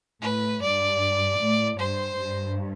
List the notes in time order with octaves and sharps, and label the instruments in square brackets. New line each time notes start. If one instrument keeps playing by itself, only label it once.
[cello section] A2 [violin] B4
[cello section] G2 [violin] D5
[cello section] A2
[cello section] G2 [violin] C5
[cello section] G2